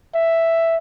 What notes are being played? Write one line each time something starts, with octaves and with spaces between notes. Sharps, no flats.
E5